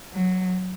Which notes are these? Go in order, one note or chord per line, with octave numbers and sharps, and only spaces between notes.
F#3